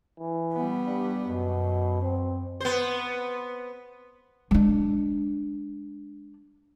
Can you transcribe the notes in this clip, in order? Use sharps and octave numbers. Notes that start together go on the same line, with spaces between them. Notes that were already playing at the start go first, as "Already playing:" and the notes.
E3
G3 B3
G2
F#2 B2
C4
B3 C5
G#3 D4